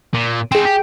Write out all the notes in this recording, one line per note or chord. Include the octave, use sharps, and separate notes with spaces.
A#2
C4 D#4 G#4 G5
G4